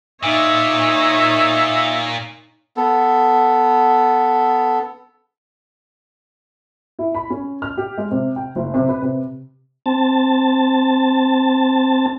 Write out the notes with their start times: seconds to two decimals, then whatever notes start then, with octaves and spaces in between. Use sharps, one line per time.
0.23 A#2 D#4 C#5 E5
2.77 B3 A4
6.99 E4
7.15 B5
7.30 C#4
7.62 F6
7.77 G4
7.98 G#3
8.11 C3
8.36 G5
8.55 F#1
8.74 C3
8.89 B4
9.02 C3
9.86 C4 A5